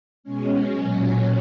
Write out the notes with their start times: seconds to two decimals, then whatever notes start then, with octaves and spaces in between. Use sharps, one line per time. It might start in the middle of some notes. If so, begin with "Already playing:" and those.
0.24 B2 G#3 C#4
0.70 A#2 F#3